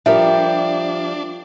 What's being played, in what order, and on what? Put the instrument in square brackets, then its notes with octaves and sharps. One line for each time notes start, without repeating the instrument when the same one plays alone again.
[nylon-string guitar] F3 G3 A#4 [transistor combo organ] D4 [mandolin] G4 [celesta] E5